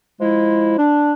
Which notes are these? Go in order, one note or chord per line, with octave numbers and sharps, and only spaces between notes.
F3 G#3 E4
D4